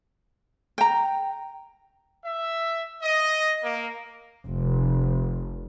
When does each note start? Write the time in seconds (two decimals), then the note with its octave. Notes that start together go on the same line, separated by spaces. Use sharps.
0.78 G5 A#5
2.24 E5
3.02 D#5
3.63 A#3
4.45 F1